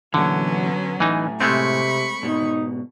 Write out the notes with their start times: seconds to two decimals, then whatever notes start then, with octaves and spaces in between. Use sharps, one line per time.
0.14 A#2 D3 E3 F#3 B3 C#4
1.00 A2 E3 D#4 G#5
1.41 C3 G#3 A3 C4 B5 C#6
2.23 G#2 B2 D#4